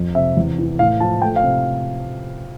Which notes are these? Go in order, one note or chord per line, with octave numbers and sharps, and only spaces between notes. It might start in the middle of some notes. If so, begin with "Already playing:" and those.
Already playing: F2
C3 E5
E2
E3
A2 F5
F3 A5
A3 G5
F5
C3